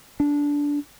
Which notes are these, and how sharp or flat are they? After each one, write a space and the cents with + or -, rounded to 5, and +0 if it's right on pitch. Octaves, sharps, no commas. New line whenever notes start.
D4 -15